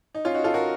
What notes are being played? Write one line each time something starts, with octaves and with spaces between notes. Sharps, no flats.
D#4
C#4 F4
D#4 F#4
F4 A4
F#4 A#4